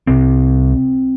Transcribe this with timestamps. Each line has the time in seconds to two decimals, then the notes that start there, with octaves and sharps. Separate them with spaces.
0.07 C2 C3 C4